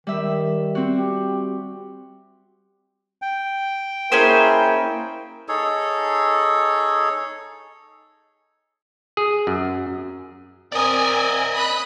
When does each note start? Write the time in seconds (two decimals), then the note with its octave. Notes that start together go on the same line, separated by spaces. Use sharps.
0.07 D#3 G3 E5
0.75 C4 F#4
0.96 G4
3.22 G5
4.12 A#3 C#4 E4 G#4 A#4 C5
5.49 D#4 G#4 A4 C#5
9.17 G#4
9.47 F#2
10.72 C4 A#4 D5 D#5 G#5
11.53 B5 D#6 F#6